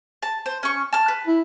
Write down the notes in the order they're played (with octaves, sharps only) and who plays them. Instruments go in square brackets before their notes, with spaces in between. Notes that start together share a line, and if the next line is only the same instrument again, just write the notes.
[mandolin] A5
C5
C#4 C#6
A5 F6
B4
[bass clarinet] E4